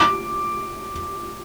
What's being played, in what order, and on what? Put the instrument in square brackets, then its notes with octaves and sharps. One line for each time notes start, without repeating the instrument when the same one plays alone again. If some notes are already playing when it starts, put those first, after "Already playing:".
Already playing: [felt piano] D6